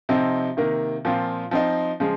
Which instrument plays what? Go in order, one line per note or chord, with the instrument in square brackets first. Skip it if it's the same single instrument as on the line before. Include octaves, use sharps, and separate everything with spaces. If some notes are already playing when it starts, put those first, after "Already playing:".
[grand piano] C3 F3 C4 D#4
C3 D#3 A#3
A#2 F3 C4 F4
F3 C4 D#4
C#3 F3 G#3